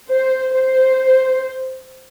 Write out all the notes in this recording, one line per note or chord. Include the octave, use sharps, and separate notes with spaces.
C5
C5